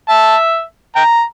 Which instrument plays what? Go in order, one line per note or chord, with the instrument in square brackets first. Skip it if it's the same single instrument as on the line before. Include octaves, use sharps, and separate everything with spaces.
[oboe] E5 [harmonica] A5
[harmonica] G5 A#5